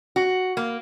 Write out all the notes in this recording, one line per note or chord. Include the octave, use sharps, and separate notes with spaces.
F#4
A#3